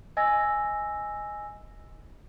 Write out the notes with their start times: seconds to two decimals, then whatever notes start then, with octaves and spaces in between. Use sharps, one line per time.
0.17 D#5 G#5 E6 A#6